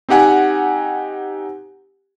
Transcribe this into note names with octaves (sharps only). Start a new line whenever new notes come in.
C4 D#4 G4 F#5 G#5